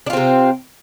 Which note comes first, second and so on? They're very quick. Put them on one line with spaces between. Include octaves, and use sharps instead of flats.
D4 F4 C4 C3